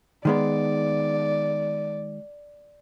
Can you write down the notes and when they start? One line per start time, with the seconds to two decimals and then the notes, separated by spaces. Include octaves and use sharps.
0.25 D#3 G#3 B3 D5